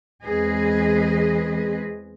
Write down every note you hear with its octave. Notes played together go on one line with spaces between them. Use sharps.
E2 G#3 C4 G#4 B4 D#5